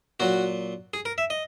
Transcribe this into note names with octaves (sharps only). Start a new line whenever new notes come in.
A#2 F#3 F#4
G#4
A#4
E5
D#5